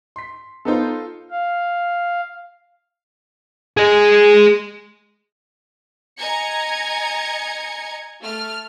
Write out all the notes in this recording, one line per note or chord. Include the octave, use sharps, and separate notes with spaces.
C6 B6
B3 D#4 F4 A4 C5
F5
G#4 D#5
D#5 G#5 A#5 G#6 C#7
A3 F6